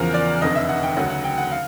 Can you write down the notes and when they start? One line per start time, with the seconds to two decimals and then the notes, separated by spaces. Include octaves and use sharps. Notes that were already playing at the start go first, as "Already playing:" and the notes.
Already playing: E2 C#3 F3 A#4
0.14 D5
0.41 F1 F2 D3 D#5
0.56 E5
0.69 F#5
0.83 G5
0.97 D2 C#3 F#3 F#5
1.10 F#5
1.24 G5
1.38 F#5
1.51 F5